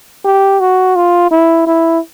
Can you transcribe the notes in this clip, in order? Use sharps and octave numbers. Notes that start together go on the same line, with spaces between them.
G4
F#4
F4
E4
E4